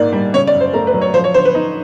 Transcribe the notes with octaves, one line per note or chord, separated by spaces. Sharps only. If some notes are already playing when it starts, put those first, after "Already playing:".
Already playing: G#2 D#3 A#3 D5
G3
C#3 C#5
D5
F#2
C5
A3 A#4
B4
F#3
C#5
F3 C5
C#5
D3 C5
B4
D#4